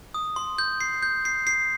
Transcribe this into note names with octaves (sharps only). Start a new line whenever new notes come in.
D#6
C6
G6
C7
G6
C7
C7